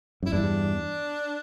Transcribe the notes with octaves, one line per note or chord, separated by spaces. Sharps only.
F#2 E4
E2 G2 D4